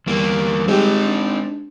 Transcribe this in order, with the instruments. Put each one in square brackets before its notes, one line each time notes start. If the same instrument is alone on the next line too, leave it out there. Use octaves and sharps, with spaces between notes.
[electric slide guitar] E2 A#3 [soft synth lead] G3
[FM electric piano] G#3 G4 [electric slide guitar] C4 D#4
[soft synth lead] D4